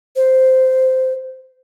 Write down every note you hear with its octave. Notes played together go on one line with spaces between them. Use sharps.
C5